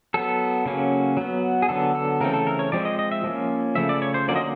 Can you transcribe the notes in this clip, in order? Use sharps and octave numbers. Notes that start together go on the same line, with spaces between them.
F#3 B3 A4
C#3 F#3 A#3 C#4
F#3 B3
G#4
D3 F#3 B3 A4
A4
C#3 E3 A3 C4 A#4
A4
A#4
C#5
F3 G#3 C4 D5
D#5
D#5
E5
F3 A#3 C#4
C#3 F3 A3 E5
D5
C#5
C5
D3 F#3 A#3 C#4 D5
D#5